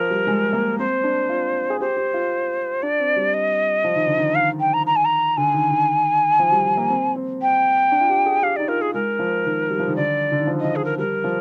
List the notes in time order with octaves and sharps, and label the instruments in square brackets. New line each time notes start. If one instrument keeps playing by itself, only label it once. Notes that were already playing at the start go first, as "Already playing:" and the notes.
Already playing: [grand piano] F3 [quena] A#4
[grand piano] G3
G#3
A#3
[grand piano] C4 [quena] C5
[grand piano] D4
F4
G#4
[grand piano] G4 [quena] C5
[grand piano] G4
F4
[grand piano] D4 [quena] D5
[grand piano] C4
G3
[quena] D#5
[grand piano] F3
D#3
D3
D#3
[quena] F5
G5
A#5
A#5
G#5
A#5
[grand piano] D3 [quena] G#5
[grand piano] D#3
D#3
F3
G3
G3
A#3
C4
C4
[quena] G5
[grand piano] D4
F4
G4
G#4
[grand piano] G4 [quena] F5
[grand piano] D#4 [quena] D5
[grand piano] F4 [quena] A#4
[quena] G#4
[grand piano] G#3 [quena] A#4
[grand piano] F3
D#3
G3
F3
D#3
[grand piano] D3 [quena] D5
[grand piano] D3
D#3
F3
[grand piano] F3 [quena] D#5
[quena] G#4
A#4
[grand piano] G3 [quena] A#4
[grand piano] F3